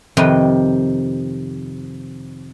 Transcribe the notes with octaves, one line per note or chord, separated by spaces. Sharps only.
F2 C3 D#3 B4 G5 C6